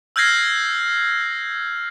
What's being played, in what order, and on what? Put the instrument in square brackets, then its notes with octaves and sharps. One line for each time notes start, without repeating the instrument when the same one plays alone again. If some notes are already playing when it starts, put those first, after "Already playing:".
[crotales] E6 F6 G6 G#6 A#6 C7